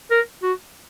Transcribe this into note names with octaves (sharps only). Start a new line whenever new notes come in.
A#4
F#4